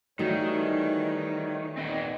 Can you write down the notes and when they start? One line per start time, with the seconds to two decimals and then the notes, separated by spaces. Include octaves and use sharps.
0.19 D#3 E3 G3 A3 D#4 F#4 C#5
1.77 D#2 A#2 B3 C4 D#5 G5